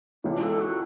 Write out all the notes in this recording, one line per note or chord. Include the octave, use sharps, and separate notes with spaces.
C#2 C#3 E3 D4
A4
F#4